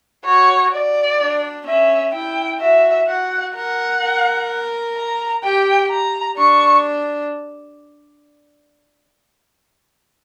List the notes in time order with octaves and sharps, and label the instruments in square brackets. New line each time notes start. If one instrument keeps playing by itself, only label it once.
[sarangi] F#4 [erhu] C#5
[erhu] D5
[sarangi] D4
[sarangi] C#4 [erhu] E5
[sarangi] E4 [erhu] G5
[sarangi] F#4 [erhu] E5
[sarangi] F#4 [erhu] F#5
[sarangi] A#4 [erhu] F#5
[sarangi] A#4
[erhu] A#5
[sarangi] G4 [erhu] G5
[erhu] A#5
[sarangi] D4 [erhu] C#6